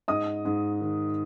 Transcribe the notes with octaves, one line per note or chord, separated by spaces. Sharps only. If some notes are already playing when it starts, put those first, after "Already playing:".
G#2 D#5 D#6
G#2
D#3